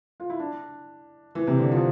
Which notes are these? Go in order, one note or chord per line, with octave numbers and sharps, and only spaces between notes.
F4
E4
D4
E3
C3
D3
F3